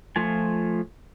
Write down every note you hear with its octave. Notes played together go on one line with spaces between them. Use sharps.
F3 A3 F4 G#5